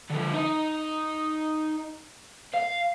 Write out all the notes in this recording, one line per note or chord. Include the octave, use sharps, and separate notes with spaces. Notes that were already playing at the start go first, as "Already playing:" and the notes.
D3 F3
D#4 D#5
F5